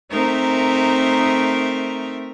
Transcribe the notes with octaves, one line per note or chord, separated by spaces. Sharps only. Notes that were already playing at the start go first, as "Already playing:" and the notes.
A3 C4 D#4 A#4 E5